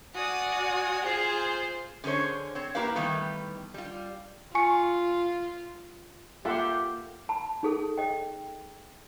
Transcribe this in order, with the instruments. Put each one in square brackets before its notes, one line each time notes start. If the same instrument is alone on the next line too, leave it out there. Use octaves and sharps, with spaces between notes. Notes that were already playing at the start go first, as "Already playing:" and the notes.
[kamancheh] F#4 D5 [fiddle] G#5 D#6
[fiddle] F4 C5 [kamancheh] G#4
[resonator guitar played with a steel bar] D3 C#4 G#4 C5 C#5
C4 C#5
A#3 E4 G4 A#4 B4 F5
D#3 E3 G3 A3 B3
G3 F4
[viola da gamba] F4 [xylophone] G#5 C#6 C#7
[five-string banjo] A#3 A4 [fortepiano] F4 [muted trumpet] G4 [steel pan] E5 F#5 C6
[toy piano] A5 B5
D#4 G#4 A4
D#5 G5